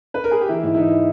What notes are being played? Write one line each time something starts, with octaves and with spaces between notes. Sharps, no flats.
B4
A#4
G#4
G4
E3 E4
G#2
E4
E3 D#4